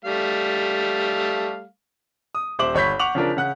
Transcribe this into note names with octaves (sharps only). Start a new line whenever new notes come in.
G3 A3 F5
D#6
D#1 C5 E5 D6 F#7
G1 C#5 B5 G6 B6
F#5 C#6 D6 F7 F#7
C#3 F3 D4 A#4
C#3 F#5 F#6